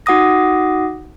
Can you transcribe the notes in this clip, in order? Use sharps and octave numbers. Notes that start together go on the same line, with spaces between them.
D#4 F#4 F#5 D6 D#6 A#6